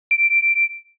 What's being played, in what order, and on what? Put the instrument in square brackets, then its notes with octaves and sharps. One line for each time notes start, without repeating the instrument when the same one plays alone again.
[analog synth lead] D7